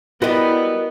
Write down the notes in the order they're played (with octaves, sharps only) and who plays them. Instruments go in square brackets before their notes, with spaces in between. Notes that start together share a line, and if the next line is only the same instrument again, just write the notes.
[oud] G3 E4 [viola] B3 [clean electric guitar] F#4 A#4 D#5